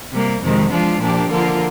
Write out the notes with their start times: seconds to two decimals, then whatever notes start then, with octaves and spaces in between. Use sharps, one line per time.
0.11 C3 G3 A#3
0.41 F2 C3 D#3 G#3
0.70 F3 G#3 D4 F4
1.00 A#2 F3 A#3 D4 G4
1.29 D3 F3 A#3 F4 A#4